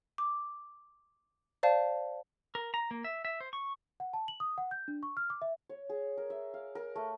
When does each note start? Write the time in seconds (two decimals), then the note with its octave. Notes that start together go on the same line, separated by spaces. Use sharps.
0.18 D6
1.63 C5 D5 F5 A5
2.55 A#4
2.74 A#5
2.91 A#3
3.04 E5
3.25 E5
3.41 C5
3.53 C#6
4.00 F#5
4.13 A5
4.28 F#7
4.40 D#6
4.58 F#5
4.71 G6
4.88 D4
5.03 C#6
5.17 F6
5.30 D6
5.42 E5
5.69 C#5
5.90 G#4
6.17 A#4
6.30 E5
6.54 F5
6.75 A#4
6.96 A3